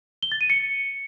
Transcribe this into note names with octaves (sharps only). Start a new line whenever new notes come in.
G7
A6
D#7
C#7